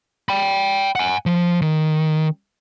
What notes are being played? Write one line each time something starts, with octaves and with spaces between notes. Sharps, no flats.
G5 B5
F#5 G#5
F3
D#3